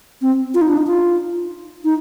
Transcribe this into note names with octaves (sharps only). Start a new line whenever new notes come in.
C4
F4
D#4
D4
D#4
F4
D#4